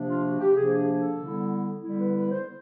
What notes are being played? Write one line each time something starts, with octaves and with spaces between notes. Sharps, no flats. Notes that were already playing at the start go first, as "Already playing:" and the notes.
Already playing: C3 F3 A#3 D4
F4
F#4
G4
C3 F3 A#3 D4 G#4
G#4
A4
D3 G3 B3 E4
D3 G3 B3 E4
B4
B4
C5